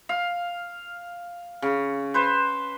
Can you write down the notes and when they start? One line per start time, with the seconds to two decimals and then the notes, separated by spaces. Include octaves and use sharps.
0.09 F5
1.62 C#3
2.14 B4 C5